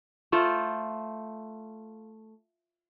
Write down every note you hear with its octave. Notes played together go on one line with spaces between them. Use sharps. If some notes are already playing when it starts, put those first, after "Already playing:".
A3 F4 A4 C5